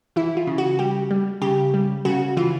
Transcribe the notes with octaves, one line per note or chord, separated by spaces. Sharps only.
E3 E4
F4
C#3
F#4
G3 G4
G3
C#3 G4
G3
C#3 F#4
E3 F4